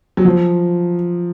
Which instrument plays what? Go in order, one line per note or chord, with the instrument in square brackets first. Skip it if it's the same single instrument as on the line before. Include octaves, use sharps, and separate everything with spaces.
[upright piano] F#3
F3